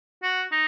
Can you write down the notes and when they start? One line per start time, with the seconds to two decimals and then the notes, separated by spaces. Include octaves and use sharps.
0.23 F#4
0.51 D#4